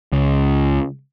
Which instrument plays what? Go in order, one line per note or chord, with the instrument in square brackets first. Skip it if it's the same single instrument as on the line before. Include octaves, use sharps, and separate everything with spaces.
[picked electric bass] C#2